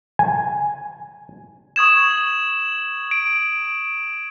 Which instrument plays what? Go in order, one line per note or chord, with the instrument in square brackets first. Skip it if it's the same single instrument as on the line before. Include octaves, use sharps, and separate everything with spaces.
[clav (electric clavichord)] G#5
[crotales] C#6 D#6 G#6 E7
F#7
D7